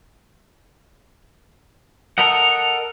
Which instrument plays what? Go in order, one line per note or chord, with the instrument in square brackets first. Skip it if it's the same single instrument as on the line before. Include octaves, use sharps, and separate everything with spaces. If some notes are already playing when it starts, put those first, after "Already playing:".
[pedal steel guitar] A4 A#4 D#5 F#5